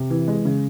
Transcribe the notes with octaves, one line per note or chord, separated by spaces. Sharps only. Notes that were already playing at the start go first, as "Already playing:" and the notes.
Already playing: C3
E3
G#3
C#3